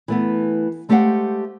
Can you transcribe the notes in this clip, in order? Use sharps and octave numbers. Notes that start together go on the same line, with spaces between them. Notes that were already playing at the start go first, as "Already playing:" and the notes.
E3 A3 B3
G#3 A3 G4 C5 F5 F#5